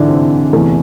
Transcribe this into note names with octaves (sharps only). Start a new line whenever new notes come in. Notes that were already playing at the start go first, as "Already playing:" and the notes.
Already playing: G#2 D3 E3 D4 E4
C3 C4
E2 C3 E3 A3